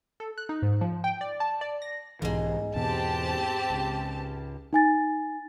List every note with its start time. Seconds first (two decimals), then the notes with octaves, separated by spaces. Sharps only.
0.20 A4
0.38 F#6
0.49 D#4
0.62 G#2
0.81 F3
1.04 G5
1.21 D5
1.40 A5
1.61 D5
1.82 A#6
2.22 B1 G#2 E3 G#3
2.75 E2 B2 C4 G4 A5
3.70 C#2
4.73 D#4 G#5 A6